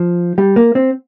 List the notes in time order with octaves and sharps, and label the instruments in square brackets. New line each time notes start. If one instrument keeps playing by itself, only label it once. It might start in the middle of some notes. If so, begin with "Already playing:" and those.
Already playing: [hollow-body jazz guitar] F3
G3
A#3
C4